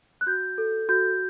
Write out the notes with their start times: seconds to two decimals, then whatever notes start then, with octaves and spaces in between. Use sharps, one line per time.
0.21 F#6
0.27 F#4 G6
0.58 A4
0.89 F#4 G6